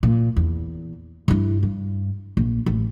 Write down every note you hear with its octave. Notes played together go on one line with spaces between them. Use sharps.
A#2
E2
G2 E4
G2
A#1
A1